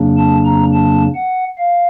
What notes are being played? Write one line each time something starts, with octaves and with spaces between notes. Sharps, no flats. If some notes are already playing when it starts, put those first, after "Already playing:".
Already playing: F2 C#3 F#3 A#3 D4
A5
A#5
A5
F#5
F5